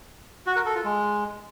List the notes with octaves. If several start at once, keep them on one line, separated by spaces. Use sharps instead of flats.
F#4
A#4
A4
F4
G#3